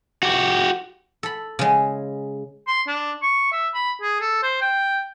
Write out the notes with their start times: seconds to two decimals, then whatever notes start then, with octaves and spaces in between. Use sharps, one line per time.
0.23 F#4 G4
1.23 A4 B5
1.59 C#3 G#3
2.67 C6
2.88 D4
3.23 C#6
3.52 E5
3.74 B5
4.02 G#4
4.21 A4
4.43 C5
4.61 G5